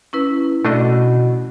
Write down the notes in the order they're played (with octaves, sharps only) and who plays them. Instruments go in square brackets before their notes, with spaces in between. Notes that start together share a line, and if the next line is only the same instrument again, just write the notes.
[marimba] C#4 E4 B4
[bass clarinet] B2 [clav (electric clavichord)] A3 D4 D#5